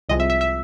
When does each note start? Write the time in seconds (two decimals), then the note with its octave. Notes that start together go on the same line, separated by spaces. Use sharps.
0.09 C2 C3 F3 G#3 D#5
0.20 E5
0.30 E5
0.41 E5